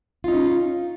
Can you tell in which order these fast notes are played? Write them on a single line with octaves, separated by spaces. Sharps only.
F4 D#4 C#4